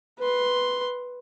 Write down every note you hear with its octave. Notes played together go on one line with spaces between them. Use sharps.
B4 C6